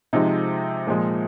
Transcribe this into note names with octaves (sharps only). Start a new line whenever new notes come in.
C3 F3 G#3 D#4
A#2 F3 G#3